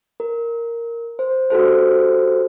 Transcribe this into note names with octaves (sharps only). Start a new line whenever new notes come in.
A#4
C5
F#4 G4 A4 C5